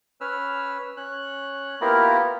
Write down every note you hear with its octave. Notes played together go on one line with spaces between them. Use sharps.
C#4 B4 E6 F6
C#4 F#6
A#3 B3 E4 F4 G4 A#4